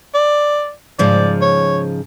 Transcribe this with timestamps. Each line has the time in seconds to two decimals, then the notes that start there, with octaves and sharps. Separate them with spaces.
0.14 D5
0.99 G#2 C#3 F3 D5
1.41 C#5